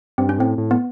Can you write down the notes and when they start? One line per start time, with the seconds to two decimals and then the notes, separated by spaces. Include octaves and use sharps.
0.18 G2 C4
0.29 C#4
0.38 A2 C4
0.58 A2
0.71 B3